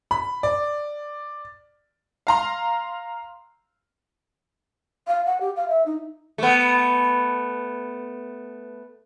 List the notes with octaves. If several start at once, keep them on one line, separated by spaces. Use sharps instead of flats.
B5
D5
F5 A#5 C6
F5
F#5
G4
F5
E5
D#4
A3 B3